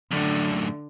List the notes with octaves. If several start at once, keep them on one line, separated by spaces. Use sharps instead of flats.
F#2 A2 D3